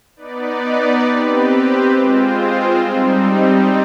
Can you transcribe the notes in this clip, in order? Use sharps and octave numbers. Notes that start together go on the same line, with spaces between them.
B3 D#4 B4 D5
C4 G4 B4
G#3 C4 F4 C5
G3 C4 D#4